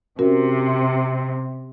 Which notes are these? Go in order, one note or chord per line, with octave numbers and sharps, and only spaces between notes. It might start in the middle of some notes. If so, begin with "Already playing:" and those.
C3 C#4 F#4 A#4